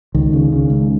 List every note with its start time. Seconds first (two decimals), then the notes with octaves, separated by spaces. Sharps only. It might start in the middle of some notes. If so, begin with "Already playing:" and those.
0.15 C#2 D#3
0.33 C#3
0.52 C#3
0.70 C#2